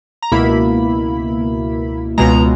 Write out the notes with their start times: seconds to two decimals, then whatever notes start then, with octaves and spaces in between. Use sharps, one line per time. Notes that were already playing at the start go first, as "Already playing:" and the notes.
0.22 A#5
0.32 C#2 B2 A#3 E4 B5
2.18 C#2 B2 G#3 A#5